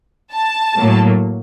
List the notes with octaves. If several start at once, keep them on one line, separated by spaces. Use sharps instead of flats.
A5
A2 F#3 A#3